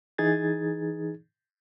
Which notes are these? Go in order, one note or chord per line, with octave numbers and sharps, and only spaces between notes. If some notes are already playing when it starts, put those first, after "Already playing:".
E3 D#4 G#4 G#6 A6